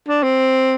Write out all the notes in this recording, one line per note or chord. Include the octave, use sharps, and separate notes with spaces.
D4
C4